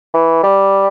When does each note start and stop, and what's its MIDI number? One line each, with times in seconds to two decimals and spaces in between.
0.14 0.40 52
0.43 0.87 55